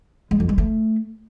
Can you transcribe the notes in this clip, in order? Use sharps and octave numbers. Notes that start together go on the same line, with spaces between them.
G#3
F2
G#3
A3